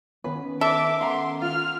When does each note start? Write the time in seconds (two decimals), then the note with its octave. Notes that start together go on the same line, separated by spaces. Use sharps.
0.24 D#3 B3 C#4 B4
0.61 A4 E5 D6
1.01 F#5 A#5 C6
1.42 F4 F6